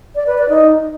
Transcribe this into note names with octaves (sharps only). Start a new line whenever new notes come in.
D5
B4
D5
D#4